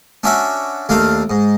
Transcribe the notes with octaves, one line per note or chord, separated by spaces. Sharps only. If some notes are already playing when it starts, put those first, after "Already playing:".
C#4 D4 F#4 D5 E5
D#2 A3 D4 F5
G#2